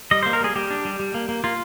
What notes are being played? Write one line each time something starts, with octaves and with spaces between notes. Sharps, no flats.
G3 D#5
A#3 C5
A#4
G3 G#4
G3 G4
D4
G3
G3
A#3
A#3
A#3 F4